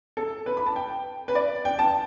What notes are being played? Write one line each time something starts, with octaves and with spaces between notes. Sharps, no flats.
A4
B4
B5
A5
G5
B4
D5
G5
A5